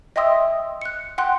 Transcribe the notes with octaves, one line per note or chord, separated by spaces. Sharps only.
D#5 E5 G5 C6 D#6 E6
F#6 C#7
F#5 G5 C6 F#6